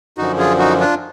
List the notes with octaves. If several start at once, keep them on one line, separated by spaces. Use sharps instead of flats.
F#2 D3 F3 D#4 F#4
F4 G#4
D#4 F#4
D4 F4